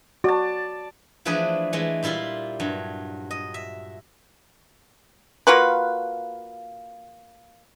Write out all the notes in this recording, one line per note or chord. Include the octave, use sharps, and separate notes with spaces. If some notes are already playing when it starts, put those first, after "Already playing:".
F#4 D5 A5
E3 F3 A3 D4 G#4 B4
E3 G#3 A3
A#2 G3 E4 F4 C6
G2 F#3
D#5
E5
A#3 F4 F#4 B4